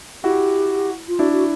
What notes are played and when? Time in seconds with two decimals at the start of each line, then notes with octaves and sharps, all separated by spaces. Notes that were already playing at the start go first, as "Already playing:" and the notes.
0.24 E4 F#4 G4
1.08 F4
1.19 D4 E4 F#4
1.32 F#4